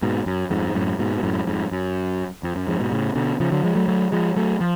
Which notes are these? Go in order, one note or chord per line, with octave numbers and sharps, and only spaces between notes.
G#2 B2
F#2
F2 G#2
G#2
F#2 A2
G#2 B2
B2
F#2 A2
F2 G#2
F#2
F2
F#2
F2 G#2
G#2 B2
A2 C#3
B2 D3
C#3 F3
D3 F#3
F3 G#3
F#3 A3
F#3 A3
F3 G#3
F#3 A3
F3